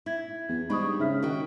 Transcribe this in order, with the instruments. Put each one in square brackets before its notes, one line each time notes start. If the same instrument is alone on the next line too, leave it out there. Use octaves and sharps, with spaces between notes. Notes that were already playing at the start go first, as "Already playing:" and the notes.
[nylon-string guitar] E4 [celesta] E5 G#6
[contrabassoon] E2 [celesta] G#6
[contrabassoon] G#2 [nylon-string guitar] G3 D4 D#4 [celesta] B5 C#6 D#6
[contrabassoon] C#3 [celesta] E5 F6 B6
[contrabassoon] D#3 [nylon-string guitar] A#3 F#4 G5 [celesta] A#4